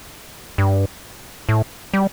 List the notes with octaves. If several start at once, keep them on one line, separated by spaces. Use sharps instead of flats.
G2
A2
G3